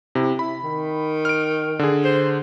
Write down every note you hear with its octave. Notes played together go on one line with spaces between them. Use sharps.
C3 E4
E4 B5
D#3
F6 D7
D3 G#4
C5